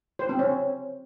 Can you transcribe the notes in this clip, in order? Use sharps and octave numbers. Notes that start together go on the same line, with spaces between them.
C5
C4
C#4